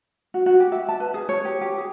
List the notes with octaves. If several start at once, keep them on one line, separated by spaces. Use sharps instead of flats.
F#4
F#4
G4
E5
A5
B4
G#4
C#5
G4
G4
G#4